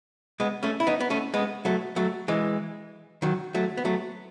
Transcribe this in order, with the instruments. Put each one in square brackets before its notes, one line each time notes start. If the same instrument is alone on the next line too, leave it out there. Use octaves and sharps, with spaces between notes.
[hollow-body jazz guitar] G#3 B3
A3 C#4
E4
B3 D#4
B3
A3 C#4
G#3 B3
F#3 A3
F#3 A3
E3 G#3
D#3 F#3
F#3 A3
B3
F#3 A3